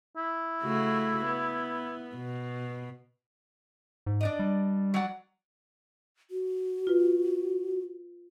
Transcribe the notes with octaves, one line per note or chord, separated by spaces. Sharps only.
E4
C#3 A3 F#4
B3
B2
G#2
D4 D5 D#5
G3
F#3 D5 F#5
F#4
F4 B4